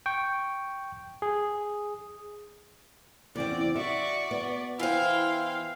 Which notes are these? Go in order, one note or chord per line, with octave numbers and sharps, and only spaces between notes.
G5 C#6
G#4
E2 C#3 C4 D5
F#4 D5 E5 C#6
B3
E3 E4 C5 F5 G5